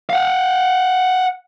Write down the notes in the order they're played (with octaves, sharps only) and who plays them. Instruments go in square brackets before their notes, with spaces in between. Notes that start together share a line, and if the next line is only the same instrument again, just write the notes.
[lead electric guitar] F5 F#5